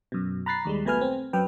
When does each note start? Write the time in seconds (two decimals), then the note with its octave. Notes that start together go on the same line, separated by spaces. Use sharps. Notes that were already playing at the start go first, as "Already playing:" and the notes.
0.12 F#2 B2
0.46 A#5 B5 F#6 A6 B6 C7
0.65 D#2 G3 G#3
0.85 B1 B2 A3 B4 G#5 F6
1.01 C4
1.33 F#2 F#3 B4 G5